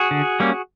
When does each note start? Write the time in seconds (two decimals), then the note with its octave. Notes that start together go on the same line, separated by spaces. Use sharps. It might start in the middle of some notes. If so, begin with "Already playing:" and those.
Already playing: F#4 G#4
0.11 D3
0.40 G3 A#3 C#4